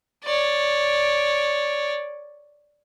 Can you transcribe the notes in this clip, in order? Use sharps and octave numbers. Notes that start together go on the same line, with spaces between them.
C#5 D5